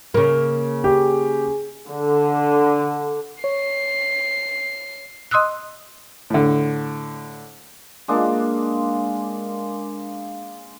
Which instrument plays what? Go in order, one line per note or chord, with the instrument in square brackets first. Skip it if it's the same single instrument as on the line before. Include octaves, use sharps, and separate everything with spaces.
[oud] C#3 A#3
[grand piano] G4 [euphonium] G#4
[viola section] D3
[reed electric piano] C#5 [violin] C7
[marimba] D#5 C6 D#6 E6 F#6
[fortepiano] A2 D3
[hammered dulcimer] G#3 A#3 D4